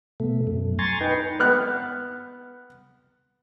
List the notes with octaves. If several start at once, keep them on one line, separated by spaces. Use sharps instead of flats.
B2 A3
F#2
G#5 A#5 C6 C#6 A6
D#4 B4 G5
B3 F6 F#6